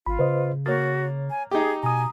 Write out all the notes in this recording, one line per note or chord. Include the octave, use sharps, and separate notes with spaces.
G#1 F4 B5
C#3 B4 C5 D#5
A#3 F#4 C#5 A6
G#5
D#4 G4 G#4
B2 G#5 A#5 D#6